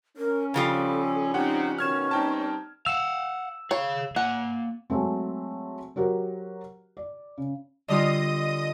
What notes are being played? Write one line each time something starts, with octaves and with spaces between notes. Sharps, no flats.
C#4 A#4
C#3 F3 G3 A4
C4 C#4 D#4 G4 F#5
B2 D#3 C#4 F6 G#6 E7
G3 B3 C4 D#4 G5 A5
F5 F#5 E6
G#4 C#5 F5
A#3 F#5 G#5
F#3 G#3 A3 C4
F#3 F#4 G4 A#4 C5
D5
C#3
D3 G3 F4 D#5 D#6